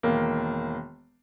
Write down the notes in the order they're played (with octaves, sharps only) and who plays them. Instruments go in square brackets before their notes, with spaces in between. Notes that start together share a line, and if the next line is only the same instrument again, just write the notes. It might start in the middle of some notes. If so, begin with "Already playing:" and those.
[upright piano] E1 D#3 A#3